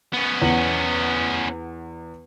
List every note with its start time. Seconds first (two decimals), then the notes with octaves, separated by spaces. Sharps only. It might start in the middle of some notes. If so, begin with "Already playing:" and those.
0.13 B3 C#4
0.42 E2 F#5 F#7